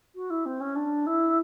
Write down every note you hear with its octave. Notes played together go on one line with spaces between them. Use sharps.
F#4
E4
C4
C#4
D4
E4